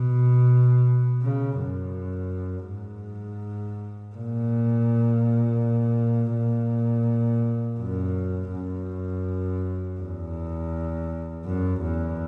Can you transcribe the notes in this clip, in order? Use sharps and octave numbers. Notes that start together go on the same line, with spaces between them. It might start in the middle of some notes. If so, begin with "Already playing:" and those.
Already playing: B2
C#3
F#2
G#2
A#2
A#2
F#2
F#2
E2
F#2
E2